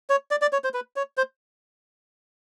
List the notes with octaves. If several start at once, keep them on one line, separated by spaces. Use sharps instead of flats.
C#5
D5
D5
C#5
C5
B4
C#5
C5